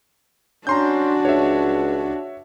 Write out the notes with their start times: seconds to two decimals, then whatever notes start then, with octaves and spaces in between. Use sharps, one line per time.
0.67 C#4 D4 F#4 A#5 C6 G6
1.25 C#2 C#5 E5